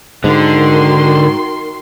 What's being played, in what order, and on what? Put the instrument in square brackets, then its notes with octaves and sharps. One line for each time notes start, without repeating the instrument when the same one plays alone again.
[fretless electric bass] G#2 [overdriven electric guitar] D3 [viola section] D#3 F#4 C6